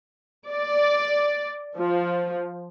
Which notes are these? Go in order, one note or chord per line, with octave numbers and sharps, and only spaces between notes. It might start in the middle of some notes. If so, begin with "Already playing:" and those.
D5
F3